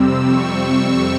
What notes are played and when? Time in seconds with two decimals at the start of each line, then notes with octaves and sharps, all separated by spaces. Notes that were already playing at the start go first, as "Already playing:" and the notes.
Already playing: F2 C3 G3 C4 E6
0.24 C#6